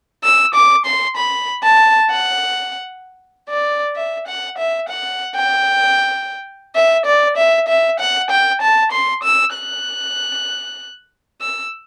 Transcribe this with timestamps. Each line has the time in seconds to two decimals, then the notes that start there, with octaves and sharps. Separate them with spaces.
0.24 E6
0.54 D6
0.86 C6
1.16 B5
1.63 A5
2.10 F#5
3.49 D5
3.96 E5
4.27 F#5
4.58 E5
4.89 F#5
5.35 G5
6.75 E5
7.06 D5
7.37 E5
7.68 E5
8.00 F#5
8.30 G5
8.61 A5
8.92 C6
9.23 E6
9.54 F#6
11.41 E6